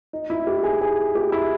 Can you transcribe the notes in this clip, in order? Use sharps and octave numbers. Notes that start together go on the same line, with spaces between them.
D#4
E4
G4
G#4
G#4
G4
E4